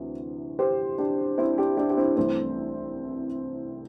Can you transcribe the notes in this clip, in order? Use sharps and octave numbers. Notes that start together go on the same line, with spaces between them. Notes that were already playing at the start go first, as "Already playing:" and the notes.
Already playing: D2 C3 E3
G4 C5
D4 G4
C4 E4
D4 G4
D4 G4
G4
C4 E4
C2 C3 E3 A3 C4